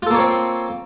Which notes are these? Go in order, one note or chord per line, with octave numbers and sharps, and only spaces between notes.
A#3 C4 F4 A4 C#5